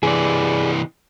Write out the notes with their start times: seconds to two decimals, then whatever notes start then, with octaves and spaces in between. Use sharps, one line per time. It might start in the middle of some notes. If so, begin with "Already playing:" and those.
0.03 C3 E3 G#4 D5